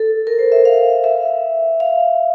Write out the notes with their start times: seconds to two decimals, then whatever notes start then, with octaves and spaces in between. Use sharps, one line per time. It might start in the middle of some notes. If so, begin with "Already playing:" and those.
Already playing: A4
0.27 A#4
0.39 C5
0.52 E5
0.65 F5
1.04 E5
1.80 F5